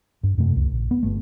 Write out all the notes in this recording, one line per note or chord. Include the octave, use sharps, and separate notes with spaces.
G2
F#2 C3 A3
C#2
A#1
B3
G1 A3